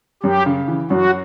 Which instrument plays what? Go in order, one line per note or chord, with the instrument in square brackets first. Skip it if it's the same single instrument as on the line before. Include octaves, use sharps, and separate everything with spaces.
[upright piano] F#2 [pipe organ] G4
[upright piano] C#3
E3
[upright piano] F#2 [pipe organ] F#4